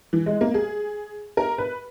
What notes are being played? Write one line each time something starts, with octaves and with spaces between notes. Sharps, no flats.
E3
G#3
A#3
G#4
A#4
B4